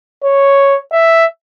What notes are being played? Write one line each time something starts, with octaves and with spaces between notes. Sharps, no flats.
C#5
E5